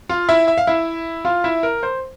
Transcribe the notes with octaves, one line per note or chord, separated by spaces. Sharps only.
F4 F5
E4 E5
E5
F5
E4 E5
F4 F5
E4 E5
A#4
C5